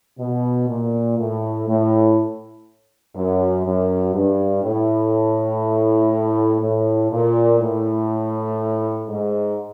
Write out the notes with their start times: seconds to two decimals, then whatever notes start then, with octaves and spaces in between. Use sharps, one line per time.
0.19 B2
0.68 A#2
1.18 A2
1.67 A2
3.15 F#2
3.65 F#2
4.14 G2
4.63 A2
6.60 A2
7.11 A#2
7.60 A2
9.08 G#2